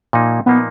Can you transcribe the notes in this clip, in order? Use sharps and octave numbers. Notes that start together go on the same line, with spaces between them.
A#2 F3 A#3 D#4
A#2 F3 A#3 B3 D#4